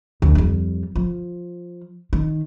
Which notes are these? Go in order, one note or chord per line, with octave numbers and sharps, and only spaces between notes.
D2
F2 G3
F3
D#3